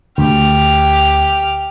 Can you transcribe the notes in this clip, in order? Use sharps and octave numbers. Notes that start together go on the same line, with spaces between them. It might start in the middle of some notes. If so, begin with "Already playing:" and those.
D2 G4 F6